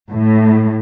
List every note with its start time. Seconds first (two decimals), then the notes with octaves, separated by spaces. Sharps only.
0.11 A2